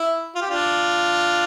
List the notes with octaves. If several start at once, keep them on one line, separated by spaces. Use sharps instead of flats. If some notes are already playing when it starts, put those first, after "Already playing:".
Already playing: E4
F4
G4
D4 F4